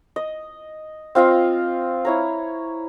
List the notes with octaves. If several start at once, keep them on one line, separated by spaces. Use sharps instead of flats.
D#5
C4 F4 D#5 F5
E4 C#5 A#5